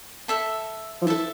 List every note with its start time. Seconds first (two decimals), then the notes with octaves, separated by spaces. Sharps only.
0.28 A4 E5 A5
1.02 F3
1.07 E3 A4 E5 A5